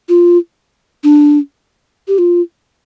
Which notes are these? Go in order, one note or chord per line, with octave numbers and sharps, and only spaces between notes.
F4
D4
G4
F4